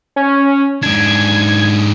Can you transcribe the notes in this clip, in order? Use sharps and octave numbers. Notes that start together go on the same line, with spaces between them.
C#4
G#2 D4 G#6